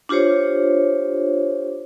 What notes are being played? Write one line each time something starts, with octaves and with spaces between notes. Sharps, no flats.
D4 F4 G4 C5 C#5